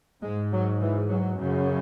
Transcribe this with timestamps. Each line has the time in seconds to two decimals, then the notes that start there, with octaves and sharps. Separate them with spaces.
0.23 G#2 G#3
0.52 F#3
0.82 E3
1.09 F#3
1.39 F#2 C#3